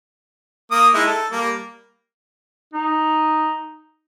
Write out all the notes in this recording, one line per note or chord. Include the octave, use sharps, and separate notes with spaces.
A#3 D#6
G#3 D#4 E4
A4
G3 A#3
D#4